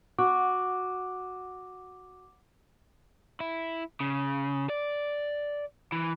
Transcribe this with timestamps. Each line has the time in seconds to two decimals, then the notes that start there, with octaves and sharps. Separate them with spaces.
0.19 F#4 D6
3.40 E4
4.00 C#3
4.70 D5
5.92 E3